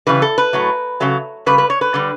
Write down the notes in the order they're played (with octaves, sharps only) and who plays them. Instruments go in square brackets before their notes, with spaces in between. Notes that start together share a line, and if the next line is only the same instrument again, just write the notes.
[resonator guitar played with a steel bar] C#3 E3 G3 B4
A4
B4
A2 F#3 A3
C#3 F#3 A3
C#3 G3 B4
B4
C#5
B4
D3 G3